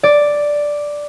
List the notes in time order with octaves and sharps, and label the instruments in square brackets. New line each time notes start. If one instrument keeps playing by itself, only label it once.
[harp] D5